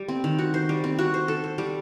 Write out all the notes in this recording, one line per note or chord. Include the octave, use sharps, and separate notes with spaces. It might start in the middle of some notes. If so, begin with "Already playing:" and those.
Already playing: G3
C4
D#3
F#4
C5
G3
C4
F#4
C5
A4
C5
G3